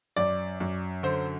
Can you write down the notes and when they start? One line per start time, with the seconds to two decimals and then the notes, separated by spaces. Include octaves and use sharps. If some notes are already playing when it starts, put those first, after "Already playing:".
0.16 F#2 D5
0.60 F#2
1.03 D3 C5